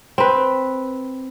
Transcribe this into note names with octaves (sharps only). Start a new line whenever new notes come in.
C4 B4